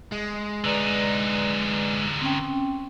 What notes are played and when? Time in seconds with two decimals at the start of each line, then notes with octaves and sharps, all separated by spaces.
0.12 G#3
0.64 D3 D#4 B4 D5 A#5
2.21 C4 C#4 G5